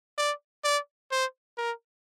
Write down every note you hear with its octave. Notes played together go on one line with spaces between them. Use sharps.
D5
D5
C5
A#4